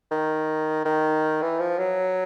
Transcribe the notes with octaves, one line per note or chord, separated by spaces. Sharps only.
D#3
D#3
E3
F3
F#3